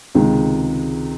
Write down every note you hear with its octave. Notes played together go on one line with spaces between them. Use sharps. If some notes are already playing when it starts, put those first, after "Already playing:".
C#2 C3 D#3 G#3